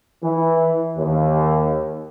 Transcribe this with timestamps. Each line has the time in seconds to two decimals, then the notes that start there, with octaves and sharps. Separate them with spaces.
0.23 E3
0.97 D#2